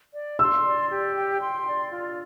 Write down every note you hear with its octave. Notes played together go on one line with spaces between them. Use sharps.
D5
C6 E6
D5
G4
G5
C6
D5
F4